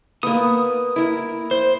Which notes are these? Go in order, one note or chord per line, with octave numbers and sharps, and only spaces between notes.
A#3 B3 D#6
E4 A#4
C5